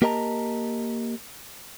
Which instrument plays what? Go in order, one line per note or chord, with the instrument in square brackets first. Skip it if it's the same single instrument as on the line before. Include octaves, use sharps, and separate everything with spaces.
[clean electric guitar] A#3 G4 A#4 D#5 A5 A#5